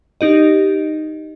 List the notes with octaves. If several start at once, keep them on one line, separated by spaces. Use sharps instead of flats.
D#4 G4 D#5